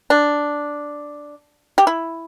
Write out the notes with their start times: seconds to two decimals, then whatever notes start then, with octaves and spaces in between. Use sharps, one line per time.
0.10 D4
1.78 G4
1.87 E4